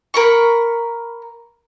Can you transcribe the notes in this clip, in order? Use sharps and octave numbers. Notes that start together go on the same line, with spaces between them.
A#4 B5 C#6